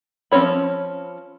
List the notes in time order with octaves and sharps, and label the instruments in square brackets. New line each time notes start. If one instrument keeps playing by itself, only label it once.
[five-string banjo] F3 C4 C#4 C#5 B5